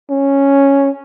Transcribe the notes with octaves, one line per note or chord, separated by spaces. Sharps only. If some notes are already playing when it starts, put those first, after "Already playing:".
C#4